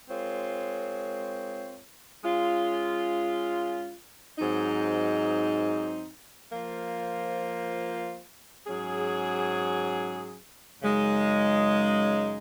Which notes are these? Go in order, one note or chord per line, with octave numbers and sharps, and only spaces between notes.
G#3 C4 F4 A#4 C#5
G#3 C#4 F4
G#2 F#3 C4 D#4
F3 A#3 F4 C5
G#2 F#3 C#4 G#4
F#2 C#3 G#3 D#4